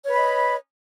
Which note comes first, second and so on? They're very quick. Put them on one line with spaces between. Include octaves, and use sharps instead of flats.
C#5 B4 B5 D#5